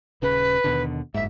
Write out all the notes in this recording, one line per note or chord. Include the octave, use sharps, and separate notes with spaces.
D#1 C#3 B4
D#2 B2 D3
F#1 G#2 E5